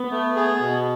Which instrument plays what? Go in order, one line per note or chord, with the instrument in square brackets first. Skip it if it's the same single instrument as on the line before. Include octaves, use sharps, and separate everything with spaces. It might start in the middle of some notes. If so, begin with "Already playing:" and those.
Already playing: [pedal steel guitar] B3
[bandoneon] A3
G#4
B2